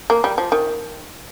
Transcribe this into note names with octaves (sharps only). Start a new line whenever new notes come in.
A#3
G3
F3
D#3